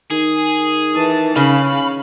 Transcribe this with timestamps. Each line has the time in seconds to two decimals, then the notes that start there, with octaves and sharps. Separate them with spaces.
0.11 D#3 G#4
0.94 E3 A5
1.36 C#3 C#4 F5 B5